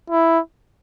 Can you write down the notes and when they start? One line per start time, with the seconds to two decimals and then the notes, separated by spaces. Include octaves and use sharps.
0.10 E4